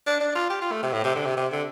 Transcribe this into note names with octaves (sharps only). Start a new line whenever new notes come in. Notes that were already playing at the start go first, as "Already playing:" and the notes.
D4
D4
F4
G4
F4
A3
C3
A2
C3
D3
C3
C3
D3